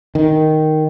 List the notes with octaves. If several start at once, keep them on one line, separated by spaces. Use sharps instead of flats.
D#3